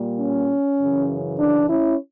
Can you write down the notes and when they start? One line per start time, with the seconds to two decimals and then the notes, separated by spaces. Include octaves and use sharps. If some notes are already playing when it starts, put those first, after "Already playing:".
Already playing: A#2 G3 A#3
0.19 C#4
0.79 F#2 C#3 E3
1.39 D4
1.69 C#4 E4